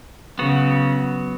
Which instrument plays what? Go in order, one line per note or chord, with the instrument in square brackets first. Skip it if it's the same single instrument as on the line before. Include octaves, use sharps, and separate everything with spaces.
[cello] C#3 [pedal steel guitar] F#3 B3 F#4